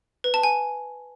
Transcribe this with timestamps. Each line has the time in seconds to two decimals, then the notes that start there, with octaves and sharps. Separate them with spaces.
0.24 B4
0.34 A5
0.43 G#5